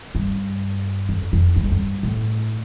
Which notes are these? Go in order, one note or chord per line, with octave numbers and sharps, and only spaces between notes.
G2
F2
F2
G2
F2
G2
A2